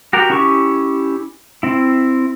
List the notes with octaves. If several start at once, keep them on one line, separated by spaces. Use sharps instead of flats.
F#4 G4 A#4
C#4 E4 G4 C#6
C4 E4